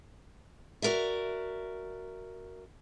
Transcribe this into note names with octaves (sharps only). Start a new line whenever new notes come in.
F#4 G#4 A#4 D5 E5